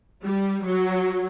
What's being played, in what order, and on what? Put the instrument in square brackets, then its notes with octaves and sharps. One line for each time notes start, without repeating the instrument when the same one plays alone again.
[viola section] G3
F#3